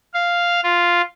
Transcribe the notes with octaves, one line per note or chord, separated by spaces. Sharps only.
F5
F4